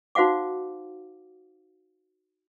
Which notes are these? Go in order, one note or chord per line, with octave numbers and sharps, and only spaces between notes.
D#4 F#4 C5 F5 F#5 D6